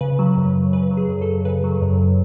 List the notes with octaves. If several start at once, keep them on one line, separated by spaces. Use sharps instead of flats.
C#3 B4
F#3
F#2
F#2
C#3 B4
F#3
G#4
F#2
A4
F#2
C#3 B4
F#3
F#2